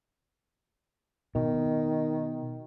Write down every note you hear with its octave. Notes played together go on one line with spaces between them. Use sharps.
B2 D#3